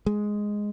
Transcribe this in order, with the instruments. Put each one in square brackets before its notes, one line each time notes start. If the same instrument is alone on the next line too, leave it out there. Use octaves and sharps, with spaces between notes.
[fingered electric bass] G#3